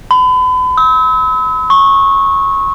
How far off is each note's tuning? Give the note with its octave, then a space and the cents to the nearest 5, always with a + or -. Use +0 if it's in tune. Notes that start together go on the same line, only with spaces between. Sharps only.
B5 +40
E6 -40
C#6 -20